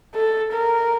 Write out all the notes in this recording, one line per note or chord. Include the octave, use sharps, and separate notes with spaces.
A4
A#4